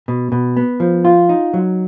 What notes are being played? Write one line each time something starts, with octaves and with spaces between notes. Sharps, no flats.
B2
B2
B3
F3
F4
D#4
F#3